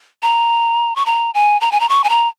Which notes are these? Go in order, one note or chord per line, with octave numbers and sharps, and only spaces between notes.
A#5
C#6
A#5
G#5
A#5
G#5
A#5
C#6
G#5
A#5